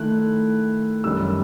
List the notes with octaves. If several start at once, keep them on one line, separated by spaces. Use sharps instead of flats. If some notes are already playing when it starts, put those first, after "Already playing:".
Already playing: D#3 A3 E4 F#6
F#2 D#3 G3 E6